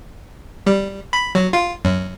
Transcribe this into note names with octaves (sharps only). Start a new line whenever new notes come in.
G3
B5
F#3
F4
F#2